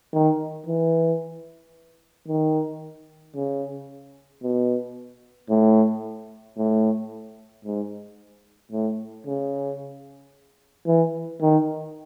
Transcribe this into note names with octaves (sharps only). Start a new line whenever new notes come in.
D#3
E3
D#3
C#3
B2
A2
A2
G#2
A2
C#3
E3
D#3